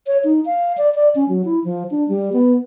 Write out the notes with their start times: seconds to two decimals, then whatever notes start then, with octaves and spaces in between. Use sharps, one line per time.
0.07 C#5
0.24 D#4
0.45 F5
0.78 D5
0.95 D5
1.15 C#4
1.29 F#3
1.45 E4
1.64 F3
1.91 D4
2.08 G3
2.33 B3